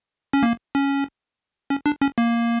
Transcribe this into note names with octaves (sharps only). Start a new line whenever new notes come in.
C#4
A#3
C#4
C#4
D4
C#4
A#3